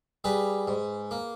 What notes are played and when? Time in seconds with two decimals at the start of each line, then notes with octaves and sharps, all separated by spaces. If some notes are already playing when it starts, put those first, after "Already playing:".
0.24 G3 G#4 B4
0.68 G#2
1.11 A#3